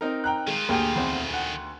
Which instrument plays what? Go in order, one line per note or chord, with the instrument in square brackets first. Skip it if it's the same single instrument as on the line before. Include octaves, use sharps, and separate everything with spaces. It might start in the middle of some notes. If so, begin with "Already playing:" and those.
[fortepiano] C4 D#4 A#4
[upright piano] G5 A#5 F#6
[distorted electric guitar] D#3 F4 [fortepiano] G#3
[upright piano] D2 G5 G#5 [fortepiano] A#3 G4 G#4
[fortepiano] E2 C4
F#5